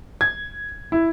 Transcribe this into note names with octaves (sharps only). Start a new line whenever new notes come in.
G#6
E4